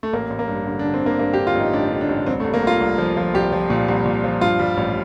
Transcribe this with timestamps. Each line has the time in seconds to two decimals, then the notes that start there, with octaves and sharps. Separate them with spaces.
0.03 A3
0.13 A1 A#3
0.30 A1
0.39 A#3
0.48 G2
0.67 D3
0.79 D4
0.84 D3
0.94 C4
1.03 D3 A#3
1.19 G2 A#3
1.34 G4
1.37 D3
1.47 F4
1.55 A1 D#4
1.73 A1 D4
1.91 D3
2.01 D4
2.09 A1
2.26 C2 C4
2.40 A3
2.45 C2
2.54 A#3
2.62 C2 F4
2.80 C2
2.98 F3
3.17 F3
3.34 C2 G4
3.52 F3
3.70 A#2
3.88 C2
4.05 A#2
4.24 F3
4.41 G2 F4
4.59 G3
4.77 A1